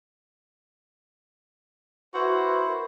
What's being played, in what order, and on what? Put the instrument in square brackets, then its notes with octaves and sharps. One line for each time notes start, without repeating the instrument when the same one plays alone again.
[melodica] E4 C5 [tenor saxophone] F#4 [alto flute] B4
[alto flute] A#4